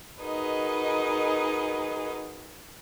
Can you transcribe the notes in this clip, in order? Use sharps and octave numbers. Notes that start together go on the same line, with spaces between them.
D#4 F#4 G#4 A#4 B4 D#5